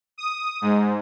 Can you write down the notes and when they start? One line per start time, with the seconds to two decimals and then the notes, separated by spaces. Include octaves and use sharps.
0.18 D#6
0.62 G#2